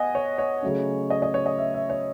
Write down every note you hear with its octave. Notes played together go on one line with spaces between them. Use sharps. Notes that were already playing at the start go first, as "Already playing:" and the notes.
Already playing: B3 D#5 F#5 G#5
C#5
C#5
C#3 F#3 A3 C#4
D#5
D#5
C#5
D#5
E5
E5
C#5